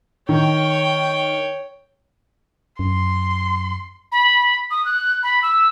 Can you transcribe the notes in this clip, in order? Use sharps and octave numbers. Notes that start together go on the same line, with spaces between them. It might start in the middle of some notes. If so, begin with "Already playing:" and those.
D#3 C#5 G5
F#2 C6
B5
D#6
F#6
B5
E6